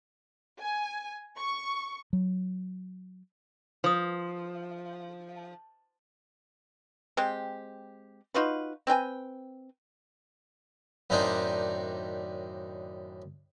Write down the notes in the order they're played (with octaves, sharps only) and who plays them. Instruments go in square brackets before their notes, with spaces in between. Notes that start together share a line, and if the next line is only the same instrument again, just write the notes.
[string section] G#5
C#6
[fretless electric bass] F#3
[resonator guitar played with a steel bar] F3 [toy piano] B4 D#6
[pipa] G#3 C4 G4
D#4 F4 F#4 B4
C4 B4 G5 G#5
[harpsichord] F#2 A2 D#3 C4 D4 D#4